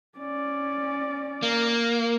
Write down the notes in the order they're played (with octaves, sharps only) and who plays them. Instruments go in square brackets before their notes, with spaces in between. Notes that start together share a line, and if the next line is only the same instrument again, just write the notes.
[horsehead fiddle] C#4 D5
[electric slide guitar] A#3